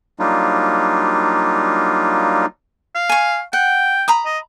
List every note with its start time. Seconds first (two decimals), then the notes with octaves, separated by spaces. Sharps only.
0.19 F#3 G3 A#3 D4 D#4 F4
2.95 F5
3.09 G#5 C#6
3.53 F#5 G5
4.08 A#5 B5 D#6
4.25 D#5